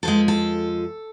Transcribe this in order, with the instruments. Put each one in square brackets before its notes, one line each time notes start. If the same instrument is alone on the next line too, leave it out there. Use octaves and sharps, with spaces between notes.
[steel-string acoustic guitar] F2 F3 G#3 A4
A4